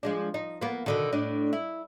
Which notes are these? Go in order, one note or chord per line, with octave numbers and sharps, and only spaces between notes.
F3 G#3 D4
D#4
A#3 B3
B2 D3 D#3
A2 D4 D#5
E4